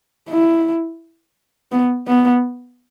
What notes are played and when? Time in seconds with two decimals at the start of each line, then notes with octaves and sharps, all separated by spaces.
0.29 E4
1.72 B3
2.07 B3